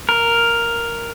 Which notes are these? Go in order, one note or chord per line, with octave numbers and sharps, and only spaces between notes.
A#4